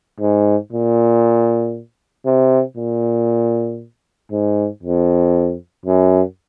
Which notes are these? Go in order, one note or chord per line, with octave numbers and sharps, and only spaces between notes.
G#2
A#2
C3
A#2
G#2
F2
F#2